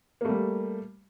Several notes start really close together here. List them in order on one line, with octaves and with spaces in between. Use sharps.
A#3 A3 G3